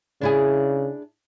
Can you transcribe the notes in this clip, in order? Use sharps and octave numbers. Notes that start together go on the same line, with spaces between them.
C#3 D4 E4 G#4